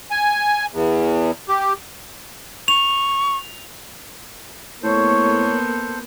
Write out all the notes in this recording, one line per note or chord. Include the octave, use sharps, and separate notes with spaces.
G#5
E2
G4
C#6 F7
A2 A#3 B3 A4 C5 C#5